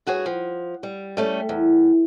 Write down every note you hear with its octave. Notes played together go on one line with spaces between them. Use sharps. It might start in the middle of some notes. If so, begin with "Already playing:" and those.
G2 F#4 G#4 C#5
F3
G3
G3 A3 C#4
E2